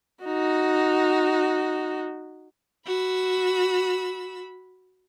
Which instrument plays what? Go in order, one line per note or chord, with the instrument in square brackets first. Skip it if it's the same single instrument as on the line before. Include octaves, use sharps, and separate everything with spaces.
[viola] D#4 F#4
[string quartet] F#4 B5 E6